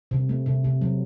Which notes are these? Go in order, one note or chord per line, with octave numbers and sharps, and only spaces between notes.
C3
A3
C3
C3
F#3